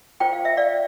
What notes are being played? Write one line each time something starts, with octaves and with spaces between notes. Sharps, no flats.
F4 C5 G5
F5
E5
D5 F5